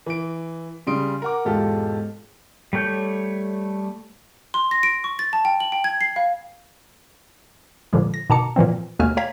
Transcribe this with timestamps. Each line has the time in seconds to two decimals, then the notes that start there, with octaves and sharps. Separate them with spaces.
0.06 E3 D7
0.87 C#3 G3 C6 D#6 D7
1.22 A#4 F#5 D6
1.45 E1 G#2 F4 G4 A4
2.73 G3 A3 C#5 G6
4.54 C6
4.71 A#6
4.83 D7
5.04 C#6
5.19 A6
5.33 A5
5.45 G5
5.60 F#7
5.72 G5
5.84 G#6
6.01 C7
6.16 F5
7.93 A#2 D3 F3 G#3
8.14 A#6
8.30 B2 D#3 A5 A#5 D6 C#7
8.56 A#2 E3 F3 C4
8.99 D#2 B2 A3 A#3 G#5 F6
9.17 C#5 F5 G5 A#5 G#6 B6